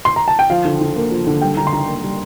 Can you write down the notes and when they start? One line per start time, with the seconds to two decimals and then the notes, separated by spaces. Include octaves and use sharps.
0.05 C6
0.16 A#5
0.28 A5
0.39 G5
0.50 F3 F5
0.65 D3
0.81 D3
0.96 A#3
1.11 F3
1.27 D3
1.41 G3 G5
1.57 D3 A#5
1.67 C6
1.72 D3 A#5
1.87 A#3
2.03 G3